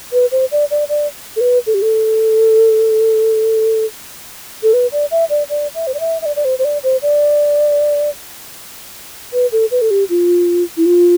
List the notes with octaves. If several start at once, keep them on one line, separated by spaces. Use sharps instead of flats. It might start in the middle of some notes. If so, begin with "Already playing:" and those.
B4
C5
D5
D5
D5
A4
B4
A4
G4
A4
A4
B4
D5
E5
D5
D5
E5
C5
D5
E5
E5
D5
D5
C5
C5
D5
C5
D5
B4
A4
B4
A4
G4
F4
E4
F4